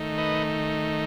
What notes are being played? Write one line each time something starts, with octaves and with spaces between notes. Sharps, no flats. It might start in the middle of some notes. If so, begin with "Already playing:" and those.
Already playing: D#3 A3 D#4
B4 D#5